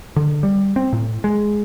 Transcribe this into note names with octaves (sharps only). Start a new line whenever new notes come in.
D3
G3
C4
A2
G#3